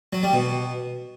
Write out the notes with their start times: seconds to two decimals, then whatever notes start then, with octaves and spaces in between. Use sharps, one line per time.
0.13 F#3
0.23 G3
0.33 B2